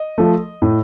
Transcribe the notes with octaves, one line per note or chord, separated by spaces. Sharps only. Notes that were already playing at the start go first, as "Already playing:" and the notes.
Already playing: D#5
F3 A3
A2